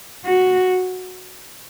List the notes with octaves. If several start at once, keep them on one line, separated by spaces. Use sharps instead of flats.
F#4